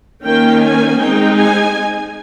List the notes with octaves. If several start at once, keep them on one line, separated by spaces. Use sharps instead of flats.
D#3 A#3 C#4 G5
G#5
G#3 C4 D#4 G5
G#5